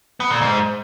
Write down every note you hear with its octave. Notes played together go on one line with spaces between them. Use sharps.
B3
A#2
G#2